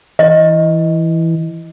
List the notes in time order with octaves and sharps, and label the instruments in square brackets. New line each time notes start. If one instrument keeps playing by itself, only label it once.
[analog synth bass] E3 [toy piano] D#5